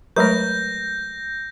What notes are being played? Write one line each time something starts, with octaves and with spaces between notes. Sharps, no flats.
F#3 G#3 A3 A#4 B4 C#5 G6 A#6